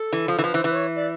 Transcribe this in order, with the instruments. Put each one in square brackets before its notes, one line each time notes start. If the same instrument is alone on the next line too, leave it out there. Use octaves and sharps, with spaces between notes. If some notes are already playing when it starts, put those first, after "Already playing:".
Already playing: [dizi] A4
[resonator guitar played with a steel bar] E3
F3
E3
[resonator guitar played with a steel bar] F3 [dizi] B4
[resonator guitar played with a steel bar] E3 [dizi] C5
[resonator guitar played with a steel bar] E3 [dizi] B4
[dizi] C5
C#5
D5